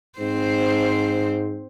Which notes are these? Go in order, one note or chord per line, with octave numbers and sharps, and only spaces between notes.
G#2 C4 C5